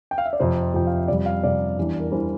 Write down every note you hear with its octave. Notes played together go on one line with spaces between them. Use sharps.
G5
F5
E5
D5
F2 C3 F3 C5
F2 C3 F3 G5
F5
E5
F2 C3 G3 D5
F5
F2 C3 G3 D5
E2 E3 G3 D4
A#4
E2 E3 G3 D4 C5